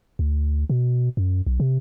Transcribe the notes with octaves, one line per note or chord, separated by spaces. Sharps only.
D2
B2
F#2
B1
C3